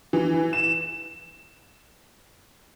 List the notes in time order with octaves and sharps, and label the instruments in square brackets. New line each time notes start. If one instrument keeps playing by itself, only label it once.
[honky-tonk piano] E3
E7